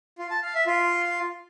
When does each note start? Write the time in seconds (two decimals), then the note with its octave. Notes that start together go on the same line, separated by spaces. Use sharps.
0.19 F4
0.31 A5
0.43 F5
0.54 E5
0.66 F4